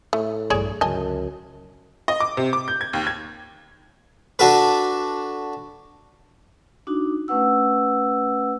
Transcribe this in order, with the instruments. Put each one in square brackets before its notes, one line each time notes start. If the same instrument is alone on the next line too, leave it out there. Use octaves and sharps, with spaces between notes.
[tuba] A2 [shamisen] A3
[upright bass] A#1 G2 [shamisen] G#4 C#5 D5
[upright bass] C#2 D3 [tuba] F#2 [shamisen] D#5 G#5 A5
[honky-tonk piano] D#5
D6
C3
D6
G6
G#6
D#2
G#6
[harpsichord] D4 F#4 A4 B4
[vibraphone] D4 D#4 F#4
A3 C#4 B4 F#5 E6